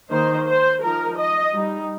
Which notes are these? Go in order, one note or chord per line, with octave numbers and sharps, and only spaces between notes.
D#3 A#3 D#4 C5
C5
F3 D#4 A#4
D#5
G3 D#4